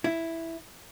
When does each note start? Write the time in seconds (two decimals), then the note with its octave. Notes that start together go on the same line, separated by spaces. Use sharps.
0.04 E4